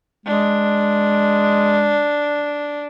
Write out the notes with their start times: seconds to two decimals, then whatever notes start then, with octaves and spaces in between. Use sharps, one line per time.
0.26 G#3 D4